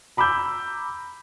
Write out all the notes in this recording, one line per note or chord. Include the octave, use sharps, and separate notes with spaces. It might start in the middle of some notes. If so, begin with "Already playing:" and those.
A#5 B5 D6 E6 G6